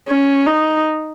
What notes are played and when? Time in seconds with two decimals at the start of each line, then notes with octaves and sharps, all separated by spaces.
0.08 C#4
0.46 D#4